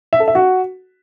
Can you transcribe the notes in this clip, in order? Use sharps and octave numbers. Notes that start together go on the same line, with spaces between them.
E5
A4
E5
F#4